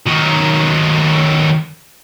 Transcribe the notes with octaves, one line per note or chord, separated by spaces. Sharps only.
D#3 F#3